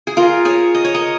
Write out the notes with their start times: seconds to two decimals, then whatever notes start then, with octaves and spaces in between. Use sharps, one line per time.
0.07 G#4
0.17 F4 A#4
0.45 G#4 C#5
0.75 D#5
0.84 C#5
0.94 A#4 D#5